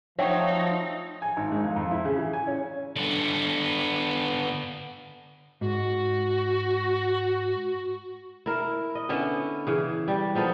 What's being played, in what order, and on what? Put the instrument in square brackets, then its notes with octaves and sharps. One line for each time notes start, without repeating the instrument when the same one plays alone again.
[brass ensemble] F3 [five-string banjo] F#3 A3 C4 [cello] D#4 [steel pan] C#5 D#5 G5
[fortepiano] G#5
G#1
G#2
F2
F2
E4
C#3
E3
G#5
C#4
[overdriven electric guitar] D3 B3
[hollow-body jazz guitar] G#2 [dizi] F#4
[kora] E4 A#4
D#5
D3 B3 C#4 E4
C#3 E3
G3
F3 B3 D#4 A4